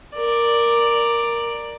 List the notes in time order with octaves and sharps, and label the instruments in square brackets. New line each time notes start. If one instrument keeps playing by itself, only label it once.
[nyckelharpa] A#4 D5